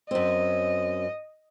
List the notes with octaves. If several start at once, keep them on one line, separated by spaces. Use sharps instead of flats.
F#2 C4 D#5